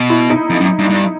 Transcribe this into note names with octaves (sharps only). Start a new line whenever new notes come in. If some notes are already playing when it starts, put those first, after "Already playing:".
Already playing: B2
E4
D#4
F2
F#2
G2
G2